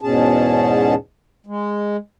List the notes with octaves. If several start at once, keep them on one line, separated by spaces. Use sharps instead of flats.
E2 G#2 B2 C#4 G#4 A5
G#3